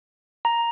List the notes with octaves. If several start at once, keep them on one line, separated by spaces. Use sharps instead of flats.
A#5